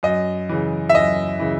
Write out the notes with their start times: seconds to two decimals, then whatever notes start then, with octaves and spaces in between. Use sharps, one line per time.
0.03 F#2 D#5
0.49 C#3 E3
0.89 E5
0.95 F#2 D#5
1.40 C#3 E3